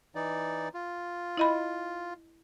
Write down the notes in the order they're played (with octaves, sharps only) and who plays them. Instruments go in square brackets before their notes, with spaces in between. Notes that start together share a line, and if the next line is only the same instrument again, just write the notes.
[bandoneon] E3 D#4 D5
F4
[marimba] E4 D#5 B5